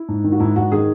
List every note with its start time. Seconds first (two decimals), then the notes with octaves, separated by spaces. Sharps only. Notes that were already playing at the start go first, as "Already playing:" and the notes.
Already playing: E4
0.08 G#2
0.24 D#3
0.32 F#4
0.40 G#2 E4
0.56 G#2 F#4
0.72 D#3 G#4